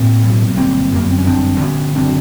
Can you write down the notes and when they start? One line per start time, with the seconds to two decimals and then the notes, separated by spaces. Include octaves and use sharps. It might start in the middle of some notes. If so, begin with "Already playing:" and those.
Already playing: A2 A#3 C4
0.23 B1
0.57 G1 A#3 C4
0.92 F#2 A#3
1.03 B3
1.11 C4
1.18 C#4
1.26 G1 C4 D4
1.60 D3 B3 C#4
1.95 F#1 C4 D4